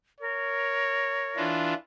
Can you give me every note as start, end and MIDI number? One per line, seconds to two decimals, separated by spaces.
0.20 1.49 70
0.20 1.58 73
1.37 1.74 52
1.37 1.74 62
1.37 1.74 65